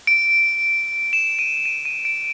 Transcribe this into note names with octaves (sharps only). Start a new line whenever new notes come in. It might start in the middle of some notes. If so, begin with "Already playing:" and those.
D7
E7
D#7
D#7
D#7
D7